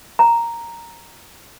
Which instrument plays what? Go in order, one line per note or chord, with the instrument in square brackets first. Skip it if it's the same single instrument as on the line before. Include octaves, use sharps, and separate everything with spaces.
[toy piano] A#5